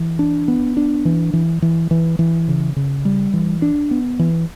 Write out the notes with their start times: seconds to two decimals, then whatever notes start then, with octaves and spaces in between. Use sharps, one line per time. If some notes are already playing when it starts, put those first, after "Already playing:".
Already playing: E3
0.19 D4
0.48 B3
0.77 D4
1.05 E3
1.33 E3
1.62 E3
1.91 E3
2.19 E3
2.48 C#3
2.76 C#3
3.05 G3
3.34 E3
3.62 D4
3.91 B3
4.19 E3